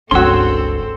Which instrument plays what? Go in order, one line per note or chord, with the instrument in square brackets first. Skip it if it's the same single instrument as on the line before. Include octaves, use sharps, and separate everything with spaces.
[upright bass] G1 C#2 [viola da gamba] C4 A4 [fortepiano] C#4 F#4 [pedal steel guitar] C6 E6